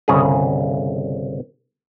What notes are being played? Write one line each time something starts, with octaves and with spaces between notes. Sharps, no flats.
G1 C2 C#3 G#4